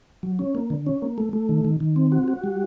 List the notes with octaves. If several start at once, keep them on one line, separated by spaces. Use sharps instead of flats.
F#3
C#4
A#3
D3
C#4
A#3
A3
A3
D#3
D#3
D#3
C4
F#4
F#4
G3